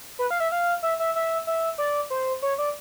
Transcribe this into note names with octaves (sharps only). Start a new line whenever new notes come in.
B4
F5
E5
F5
E5
E5
E5
E5
D5
C5
C#5
D5